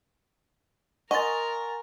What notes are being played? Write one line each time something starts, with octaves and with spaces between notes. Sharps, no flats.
A#4 D#5 F#5 G#5 C6 C#6 A6